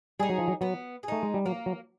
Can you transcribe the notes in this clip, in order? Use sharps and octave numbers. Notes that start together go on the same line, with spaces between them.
G3 D#4 G#4
F#3
F3
F#3
F#3 B3
G#4
A3 D#4
G#3
G3
F#3 A#3
F#3